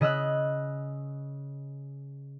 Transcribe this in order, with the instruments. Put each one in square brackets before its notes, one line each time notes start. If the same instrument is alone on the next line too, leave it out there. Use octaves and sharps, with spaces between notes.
[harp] C#3 D#5 E6 F#6